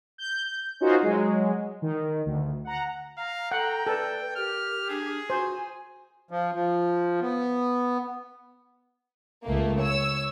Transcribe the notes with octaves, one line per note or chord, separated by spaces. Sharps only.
G6
C#4 D#4 F4 F#4 A#4 C5
F#3 G#3
D#3
D2
F#5 A#5
F5 A#5
A4 F#5 G5
A4 B4 D5
G4 A#4 F6
D4 G#4
F#4 C5 G#5
F3
F3
B3
C#2 A3 A#3
C#5 E6